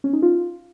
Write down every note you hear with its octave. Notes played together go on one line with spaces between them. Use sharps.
C#4
D#4
F4